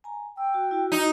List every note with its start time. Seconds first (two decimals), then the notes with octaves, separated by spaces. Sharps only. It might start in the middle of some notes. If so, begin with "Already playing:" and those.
0.04 G#5 A#5
0.37 G5 E6
0.54 F#4
0.71 E4 F#4
0.92 D#4